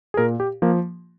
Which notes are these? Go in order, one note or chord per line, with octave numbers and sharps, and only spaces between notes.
G#4
A#2 A#4
G4
F3 A#3